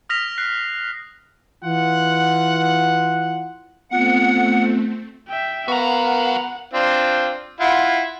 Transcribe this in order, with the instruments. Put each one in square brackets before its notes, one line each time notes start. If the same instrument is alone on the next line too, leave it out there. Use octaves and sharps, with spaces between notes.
[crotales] D#6 F6 A#6 B6 F7
F#6 C7
[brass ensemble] E3 F4 F#5
[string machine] A3 C4 [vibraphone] B3 F4 [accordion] F#5
[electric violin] E5 G5
[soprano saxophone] B3 [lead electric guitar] F#4 A#5 [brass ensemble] A#4 F5 [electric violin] F#5
[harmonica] C4 D4 F4
E4 F4 F#5